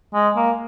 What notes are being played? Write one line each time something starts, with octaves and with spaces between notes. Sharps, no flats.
G#3
A#3